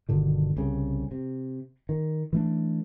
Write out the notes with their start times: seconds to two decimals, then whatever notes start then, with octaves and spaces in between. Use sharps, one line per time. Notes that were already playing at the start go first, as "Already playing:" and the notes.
0.09 G1 B2 D3 D#3
0.57 C2 C#3
1.11 C3
1.89 D#3
2.33 E3 A3 D4